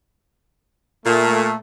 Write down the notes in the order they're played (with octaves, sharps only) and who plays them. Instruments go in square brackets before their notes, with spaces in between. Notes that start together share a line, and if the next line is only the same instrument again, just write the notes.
[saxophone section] A#2 [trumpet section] A3